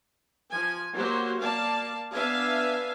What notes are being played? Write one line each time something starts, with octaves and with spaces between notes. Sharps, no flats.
F3 G#5
F#3 A#3 F#4 G4 C5
A#3 D5 F5 A5
B3 D4 E5 F5 G#5